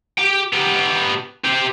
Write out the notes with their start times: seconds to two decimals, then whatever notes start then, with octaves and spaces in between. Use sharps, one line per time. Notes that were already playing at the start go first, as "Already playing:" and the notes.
0.18 G4 G5
0.53 B3 G4
1.44 G4 C5